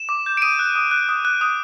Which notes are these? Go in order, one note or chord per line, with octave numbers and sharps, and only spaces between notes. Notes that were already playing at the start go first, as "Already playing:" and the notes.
Already playing: E7
D6
G6
D7
D#6 D#7
F#6
D#6
F#6
D#6
F#6
D#6